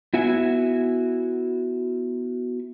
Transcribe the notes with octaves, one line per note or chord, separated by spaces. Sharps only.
B3 E4 F#4 E5 F#5 G#5